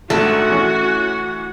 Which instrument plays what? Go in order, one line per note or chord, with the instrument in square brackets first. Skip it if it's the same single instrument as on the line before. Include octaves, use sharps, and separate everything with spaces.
[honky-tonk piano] A#1 G#2 [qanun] A3 [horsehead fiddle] F#4 F#5
[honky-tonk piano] E3 C#4